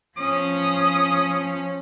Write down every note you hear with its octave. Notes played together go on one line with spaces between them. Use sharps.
F3 C#4 D#6